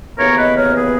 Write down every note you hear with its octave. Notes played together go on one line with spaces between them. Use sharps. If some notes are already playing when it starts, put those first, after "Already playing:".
D#2 C#3 E3 B3 A#4 C#5
B4 D#5
A#4 C#5
G#4 B4